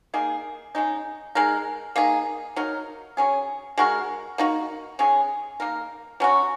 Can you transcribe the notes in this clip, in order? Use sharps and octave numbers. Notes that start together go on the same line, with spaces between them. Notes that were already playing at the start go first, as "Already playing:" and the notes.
A#3 D#4 G#4
C#3 G#3 D#4
G#3 D#4 A#4
A#3 D#4 G#4
F#3 D#4 A#4
F#3 C#4 G#4
G#3 F#4 A#4
A#3 D#4 F#4
G#3 C#4 G#4
A#3 D#4 A#4
F#3 C#4 F#4